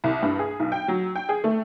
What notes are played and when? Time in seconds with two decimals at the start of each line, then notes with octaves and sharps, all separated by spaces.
0.04 C2
0.22 G2
0.39 G#4
0.60 B1
0.72 G5
0.88 F#3
1.16 G5
1.29 G#4
1.44 A3